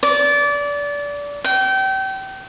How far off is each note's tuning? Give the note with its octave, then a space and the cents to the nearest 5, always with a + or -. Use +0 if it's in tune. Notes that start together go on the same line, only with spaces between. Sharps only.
D5 -25
G5 -30